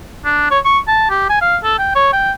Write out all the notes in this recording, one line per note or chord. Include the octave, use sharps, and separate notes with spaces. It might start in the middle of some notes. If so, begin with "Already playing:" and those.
D4
C#5
C#6
A5
G4
G#5
F5
A4
G5
C#5
G5